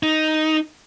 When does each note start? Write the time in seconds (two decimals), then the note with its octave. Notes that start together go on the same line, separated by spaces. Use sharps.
0.03 D#4